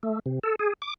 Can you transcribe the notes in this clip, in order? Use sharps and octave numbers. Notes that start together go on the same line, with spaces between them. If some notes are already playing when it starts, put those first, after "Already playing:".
A3
C3
A4
G#4
D6